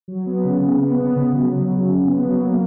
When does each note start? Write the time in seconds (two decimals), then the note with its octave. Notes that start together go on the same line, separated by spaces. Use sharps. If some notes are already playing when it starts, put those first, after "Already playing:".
0.08 F#3
0.26 B3
0.44 C#3
0.62 C#3
0.80 B3
0.98 B3
1.16 C#3
1.35 F#3
1.52 F#3
1.71 C#3
1.88 C#3
2.07 B3
2.24 F#3
2.42 A#3